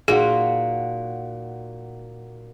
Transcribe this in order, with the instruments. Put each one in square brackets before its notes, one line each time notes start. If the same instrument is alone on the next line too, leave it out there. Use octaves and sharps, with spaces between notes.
[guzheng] A#2 [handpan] D#4 F#4 F#5 [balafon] G#4